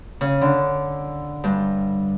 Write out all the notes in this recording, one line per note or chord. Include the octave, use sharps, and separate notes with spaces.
C#3
D3
G2